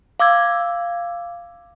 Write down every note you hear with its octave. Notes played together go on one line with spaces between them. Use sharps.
F5 D6 E6 G#6